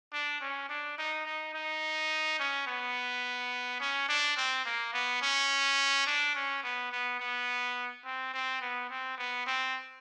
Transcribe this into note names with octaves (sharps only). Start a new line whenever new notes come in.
D4
C#4
D4
D#4
D#4
D#4
C#4
B3
C#4
D4
C4
A#3
B3
C#4
D4
C#4
B3
B3
B3
C4
C4
B3
C4
B3
C4